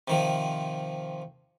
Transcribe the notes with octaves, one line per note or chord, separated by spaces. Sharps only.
C3 D#3 F3